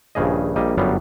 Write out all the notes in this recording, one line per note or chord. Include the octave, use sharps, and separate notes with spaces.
A#1 G2 C#3 G#4 D#5
A#1 G3 A#3 D#5
G1 F#2 F#3 G3 B3 F5